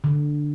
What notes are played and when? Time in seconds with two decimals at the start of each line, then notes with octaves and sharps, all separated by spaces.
0.04 D3